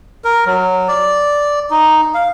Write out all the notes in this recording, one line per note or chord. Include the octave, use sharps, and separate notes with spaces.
A#4
F#3
D5
D#4
F5